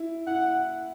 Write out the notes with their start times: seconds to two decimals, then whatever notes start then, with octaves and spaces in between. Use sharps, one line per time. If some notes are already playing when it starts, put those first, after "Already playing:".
Already playing: E4
0.27 E4 F#5